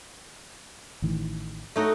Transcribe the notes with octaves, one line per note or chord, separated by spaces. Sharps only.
A1 D#3 E3
A3 D#4 F#4